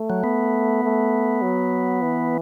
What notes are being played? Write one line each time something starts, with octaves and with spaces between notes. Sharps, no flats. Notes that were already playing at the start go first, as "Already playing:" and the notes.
Already playing: A3
F#3
B3
A3
F#3
E3